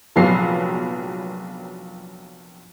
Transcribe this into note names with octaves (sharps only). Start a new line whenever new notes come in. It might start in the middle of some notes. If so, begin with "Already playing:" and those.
F1 A#1 F#3 B3 F4 C7